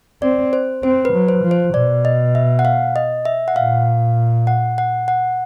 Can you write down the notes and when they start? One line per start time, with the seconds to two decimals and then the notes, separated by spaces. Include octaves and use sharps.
0.22 C4 D5
0.53 C5
0.83 C4 C5
1.05 B4
1.13 F#3
1.28 C5
1.44 F3
1.51 C5
1.74 B2 D5
2.05 D#5
2.35 E5
2.59 F#5
2.65 F5
2.96 D#5
3.25 E5
3.48 F#5
3.56 A#2 F5
4.47 F#5
4.78 F#5
5.08 F#5